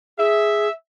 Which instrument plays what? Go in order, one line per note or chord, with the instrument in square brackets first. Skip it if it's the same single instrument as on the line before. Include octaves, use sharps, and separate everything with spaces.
[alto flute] G#4 [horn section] E5